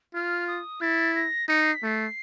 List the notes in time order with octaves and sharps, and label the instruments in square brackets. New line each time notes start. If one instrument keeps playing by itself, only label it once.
[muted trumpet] F4 [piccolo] F6
[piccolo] D#6
[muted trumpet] E4 [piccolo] A6
[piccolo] A#6
[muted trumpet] D#4 [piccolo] C#7
[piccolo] C7
B6
[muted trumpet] A3 [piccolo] C7